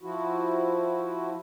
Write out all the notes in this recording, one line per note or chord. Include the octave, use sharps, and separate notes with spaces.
F3 E4 F#4